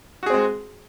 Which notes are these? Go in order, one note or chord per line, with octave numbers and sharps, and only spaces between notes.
G#3 C4 F#4 G#4